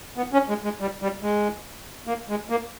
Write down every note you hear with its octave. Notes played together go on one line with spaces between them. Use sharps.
B3
C#4
G#3
G#3
G3
G3
G#3
A#3
G#3
A#3